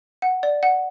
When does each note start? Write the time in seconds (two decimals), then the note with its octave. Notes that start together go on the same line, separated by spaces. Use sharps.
0.22 F#5
0.43 D5
0.63 F#5